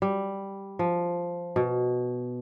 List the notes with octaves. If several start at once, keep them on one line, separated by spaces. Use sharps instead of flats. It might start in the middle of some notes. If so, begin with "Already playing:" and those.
G3
F3
B2